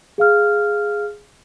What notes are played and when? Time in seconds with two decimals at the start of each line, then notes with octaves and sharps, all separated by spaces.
0.18 G#4 F5 F6